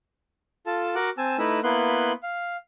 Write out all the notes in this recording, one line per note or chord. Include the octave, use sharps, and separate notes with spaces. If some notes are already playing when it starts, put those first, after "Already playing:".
F4 A4 A5
F#4 A#4 F#5 D6
C4 G#5 A5 E6
A3 D#4 E4 B4 E6
A#3 B3 E4 B4 C6 F#6
F5